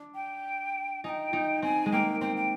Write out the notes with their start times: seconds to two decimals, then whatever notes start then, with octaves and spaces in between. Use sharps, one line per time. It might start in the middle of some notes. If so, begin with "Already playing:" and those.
Already playing: D4
0.15 G5
1.04 D#4 G#5
1.09 G5
1.33 D#4
1.62 C4 G#5
1.86 G#3
1.92 A#3 G5
2.21 C4 G5
2.36 G5